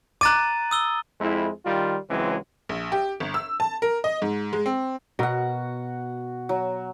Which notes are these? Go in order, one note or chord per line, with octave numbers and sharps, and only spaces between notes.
A#5 D6 F#6 A6 D#7
D#6 E6 G7
F2 G#3 E4
D#3 G3 F4
C#2 E3 F#3 G#3 C4
A#1
G4
G1
E6
A5
A#4
D#5
G#2
G#3
C4
B2 F#4 A#4 F#5
F#3